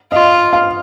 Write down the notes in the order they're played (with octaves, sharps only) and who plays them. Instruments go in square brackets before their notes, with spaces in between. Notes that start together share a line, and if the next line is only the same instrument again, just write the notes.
[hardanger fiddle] F4 [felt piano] D#5
[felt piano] F5